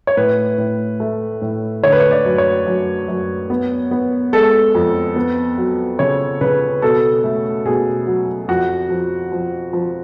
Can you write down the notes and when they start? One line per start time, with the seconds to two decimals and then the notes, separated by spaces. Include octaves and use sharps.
0.07 C#5
0.17 A2 B4
0.58 A2
1.00 A3
1.42 A2
1.83 D3 C#5
1.92 B4
2.00 C#5
2.11 D5
2.25 F#2
2.38 C#5
2.67 F#2
3.08 F#2
3.50 B3
3.91 B3
4.33 G#3 A4
4.75 F2
5.16 B3
5.58 F#3
5.99 C#3 C#5
6.41 C#3 B4
6.82 B2 A4
7.24 A3
7.65 B2 G#4
8.07 F#3
8.48 F2 F#4
8.90 F3
9.32 F3
9.73 F3